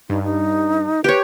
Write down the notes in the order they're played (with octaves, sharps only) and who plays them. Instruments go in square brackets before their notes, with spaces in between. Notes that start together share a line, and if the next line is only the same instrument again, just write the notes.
[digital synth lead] G2 [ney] D#4
[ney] D#4
[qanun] G4 C#5 [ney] B4